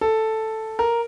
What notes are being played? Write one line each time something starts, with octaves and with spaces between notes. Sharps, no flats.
A4
A#4